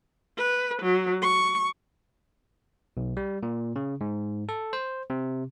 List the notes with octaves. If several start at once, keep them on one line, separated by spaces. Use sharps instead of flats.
B4
F#3
C#6
B1
G3
A#2
C#3
G#2
A4
C5
C3